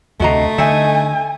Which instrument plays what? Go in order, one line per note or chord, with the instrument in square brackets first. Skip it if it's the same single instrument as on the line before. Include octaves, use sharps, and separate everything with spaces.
[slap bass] D2 C3 [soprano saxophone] A3 [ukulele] F#4 D#5 A#5
[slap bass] D3 [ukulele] D#4 D#5 E5 [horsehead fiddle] G#5